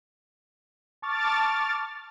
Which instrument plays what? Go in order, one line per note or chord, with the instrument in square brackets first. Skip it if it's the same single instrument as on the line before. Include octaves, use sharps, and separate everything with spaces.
[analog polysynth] A5 C#6 D6 F6 A6